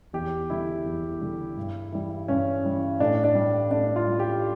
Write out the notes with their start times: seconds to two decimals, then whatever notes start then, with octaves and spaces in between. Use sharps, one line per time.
0.13 E2 G4
0.50 D3 G3 E4
0.86 E2
1.21 D3 G3
1.57 G2
1.92 E3 G3
2.28 G2 C#4
2.64 E3 G3
3.00 A2 D4
3.24 D4
3.35 G3
3.71 A2 D4
3.96 F4
4.07 G3
4.19 G4